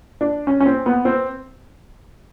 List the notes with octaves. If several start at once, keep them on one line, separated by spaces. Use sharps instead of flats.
D4
C#4
C#4
C4
B3
C4